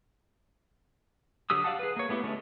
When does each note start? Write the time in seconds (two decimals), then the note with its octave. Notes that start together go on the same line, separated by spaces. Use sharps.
1.50 D3 F#3 G4 D#6 E6
1.64 D5 F5 F#5 A5
1.79 G#4 B4
1.96 A#3 C#5
2.09 A3 B3 E4 G4
2.24 D3 G#3 A3 C#4